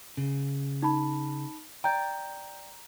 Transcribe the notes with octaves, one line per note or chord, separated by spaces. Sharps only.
C#3
D#4 A5 B5
D5 G5 A#5 G6